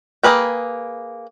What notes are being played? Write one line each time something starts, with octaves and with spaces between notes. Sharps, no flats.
A#3 G#4 B4 G5